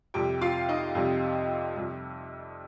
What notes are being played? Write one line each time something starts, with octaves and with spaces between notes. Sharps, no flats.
F2 C3 G3 G4 G5
F4 F5
D#4 D#5
F2 C3 G3
F2 C3 G3